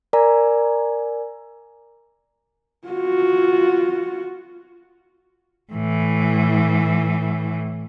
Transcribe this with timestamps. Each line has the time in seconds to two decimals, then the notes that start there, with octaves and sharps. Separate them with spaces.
0.13 A#4 D5 G#5 A#5
2.88 F4 F#4
5.73 A2 E3